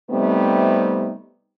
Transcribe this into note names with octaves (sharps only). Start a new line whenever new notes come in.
C3 G3 A3 B3 C4 D#4